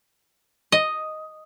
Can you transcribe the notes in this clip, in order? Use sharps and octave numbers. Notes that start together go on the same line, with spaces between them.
D#5